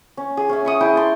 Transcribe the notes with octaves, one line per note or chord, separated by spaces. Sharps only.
C#4
G#4
C#4 E5 G#5
E5 C#6 D#6
E4 G#4 G5
A5 C6